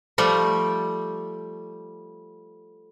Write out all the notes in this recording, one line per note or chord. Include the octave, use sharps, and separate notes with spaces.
F3 G3 A3